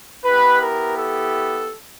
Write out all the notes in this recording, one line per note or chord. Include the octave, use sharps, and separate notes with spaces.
B3 E4 G4 B4
A#4
A4